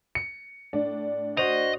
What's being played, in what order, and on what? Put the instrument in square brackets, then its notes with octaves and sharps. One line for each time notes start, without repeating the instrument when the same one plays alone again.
[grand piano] C#7
[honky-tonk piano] A2 D4
[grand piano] F#4 C5 F7 [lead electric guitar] D#5